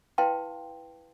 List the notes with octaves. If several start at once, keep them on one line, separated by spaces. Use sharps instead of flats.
E4 B4 F5 G5 A5 C6